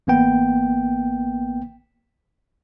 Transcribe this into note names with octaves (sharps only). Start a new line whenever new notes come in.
A1 A#3 B3 G5